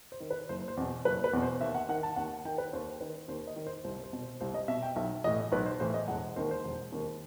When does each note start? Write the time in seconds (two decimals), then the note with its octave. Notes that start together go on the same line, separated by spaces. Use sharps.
0.12 C5
0.20 D#3
0.31 B4
0.49 F#1 C5
0.68 C5
0.77 E2 B2
1.05 F#1 B4
1.24 B4
1.33 E2 B2
1.42 C5
1.61 D#2 E5
1.75 F#5
1.89 D#3 F#5
2.03 A5
2.16 D#2 F#5
2.45 D#3 G5
2.58 B4
2.73 D#2 C5
3.01 D#3 B4
3.28 D#2 C5
3.47 D#5
3.56 D#3
3.67 C5
3.84 C2 C5
4.04 C5
4.13 B2
4.23 C5
4.41 C2 C5
4.54 D#5
4.68 B2 E5
4.83 G5
4.96 B1 E5
5.24 A2 E3 D#5
5.52 B1 B4
5.66 C5
5.80 A2 E3 C5
5.94 D#5
6.08 E1 F#5
6.36 D#2 D#3 C5
6.51 C5
6.64 E1
6.92 D#2 D#3